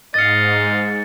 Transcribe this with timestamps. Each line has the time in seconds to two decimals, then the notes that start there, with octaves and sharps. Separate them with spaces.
0.14 G#2 D#5 F5 A6 C#7